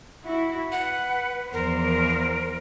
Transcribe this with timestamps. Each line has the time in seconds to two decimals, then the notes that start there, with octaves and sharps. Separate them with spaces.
0.24 E4 F#4
0.72 B4 F#5
1.53 E2 F3 A#4 C5